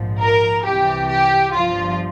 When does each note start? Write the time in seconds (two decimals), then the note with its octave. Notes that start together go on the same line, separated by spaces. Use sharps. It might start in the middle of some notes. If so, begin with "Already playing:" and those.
Already playing: A#1 G#2 F3
0.21 A#4
0.65 C2 C3 E3 G4
1.10 G4
1.54 G1 G2 F3 F4